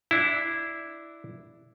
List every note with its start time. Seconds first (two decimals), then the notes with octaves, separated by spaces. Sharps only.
0.11 D4 E4